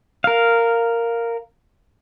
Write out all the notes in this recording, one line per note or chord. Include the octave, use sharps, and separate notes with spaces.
A#4 F5